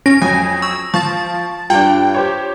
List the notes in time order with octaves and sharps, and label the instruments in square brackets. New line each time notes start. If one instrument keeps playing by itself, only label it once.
[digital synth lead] C#4 [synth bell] A#6 [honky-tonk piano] D7
[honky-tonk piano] F2 F#3 [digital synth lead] G#5
[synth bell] C#6 [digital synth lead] E6
[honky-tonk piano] F3 F4 [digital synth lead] A5 [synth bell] C#6 A6
[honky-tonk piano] G2 D4 [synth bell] F4 [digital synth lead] G5
[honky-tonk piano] G4 C5 C#5